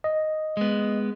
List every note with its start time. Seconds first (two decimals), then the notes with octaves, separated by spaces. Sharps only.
0.04 D#5
0.57 G#3 B3